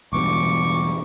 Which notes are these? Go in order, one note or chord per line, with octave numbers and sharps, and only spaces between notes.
E1 E2 G2 C#6 D6